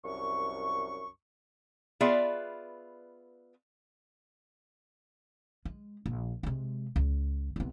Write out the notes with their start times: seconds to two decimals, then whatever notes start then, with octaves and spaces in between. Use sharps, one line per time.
0.04 C2 F#2 C#6
2.01 B3 F4 G#4 D5 E5
5.65 G#3
6.06 A#1
6.43 C3 G#3
6.96 C#2
7.56 C2 B3